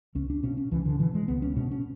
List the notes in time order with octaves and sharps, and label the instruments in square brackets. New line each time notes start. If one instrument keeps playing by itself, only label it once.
[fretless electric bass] C#2 C#4
D4
B2 C#4
C#4
C#2 E3
D3
B2 E3
G#3
C#2 B3
C#4
B2 C#4
C#4